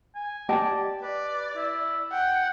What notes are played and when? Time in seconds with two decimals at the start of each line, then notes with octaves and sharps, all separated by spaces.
0.15 G#5
0.49 G4 D5 D#5 A5
1.01 B4 D5
1.56 E4
2.12 F#5 G5